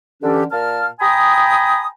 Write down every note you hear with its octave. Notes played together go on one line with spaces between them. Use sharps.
D3 E3 C#4 D4 G4 A4
A#2 A#4 F5 A5 F6
G5 G#5 A#5 B5 D#6